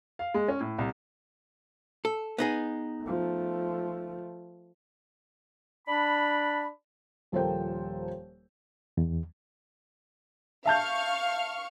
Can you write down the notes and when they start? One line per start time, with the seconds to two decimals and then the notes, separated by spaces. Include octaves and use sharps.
0.19 F5
0.34 G#3
0.48 C#4
0.60 A2
0.78 C2
2.05 A4
2.38 B3 D#4 G#4
3.03 F3 A3
5.87 D4 B5
7.32 D#1 F3 A4 A#4 C5 G5
8.97 E2
10.66 E5 F5 A5 C#6 F6 G6